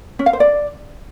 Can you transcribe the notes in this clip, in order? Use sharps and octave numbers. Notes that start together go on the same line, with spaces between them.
C#4
F5
C5
D5